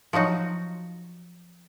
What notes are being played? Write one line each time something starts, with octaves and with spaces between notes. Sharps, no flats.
F3 F#3 D#4 F#4